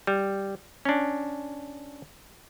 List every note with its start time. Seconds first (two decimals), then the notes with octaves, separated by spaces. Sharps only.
0.07 G3
0.85 C#4 D4